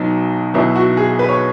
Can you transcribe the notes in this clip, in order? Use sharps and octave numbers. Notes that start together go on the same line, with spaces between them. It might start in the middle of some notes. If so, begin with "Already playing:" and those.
Already playing: B1 B2 F#3 D#4
B1 B2 F#3 E4
F#4
G#4
B4
C#5